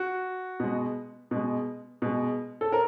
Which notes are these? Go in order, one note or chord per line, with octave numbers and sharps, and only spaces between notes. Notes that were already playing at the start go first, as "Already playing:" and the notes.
Already playing: F#4
B2 G#3
B2 G#3
B2 G#3
A4
A#4